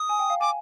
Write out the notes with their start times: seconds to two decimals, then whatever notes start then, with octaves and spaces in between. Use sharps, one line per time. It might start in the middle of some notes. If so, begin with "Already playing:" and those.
Already playing: D#6
0.09 G#5
0.19 G5
0.30 F5
0.41 G#5 D6